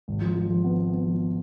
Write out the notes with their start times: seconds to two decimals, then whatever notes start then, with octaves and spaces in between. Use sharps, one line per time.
0.08 G#1
0.21 F3
0.35 F3
0.50 F3
0.64 B3
0.79 B3
0.93 B3
1.06 F3